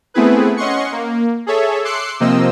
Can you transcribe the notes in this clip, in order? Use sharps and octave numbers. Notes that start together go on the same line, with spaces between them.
A3 B3 C4 E4 G#4 B4
C#4 D#5 F#5 C6 C#6 C#7
A#3
G#4 A4 C#5 E5
C6 D6 E6 F#6 C7 C#7
C3 F3 A#3 C4 D#5 E6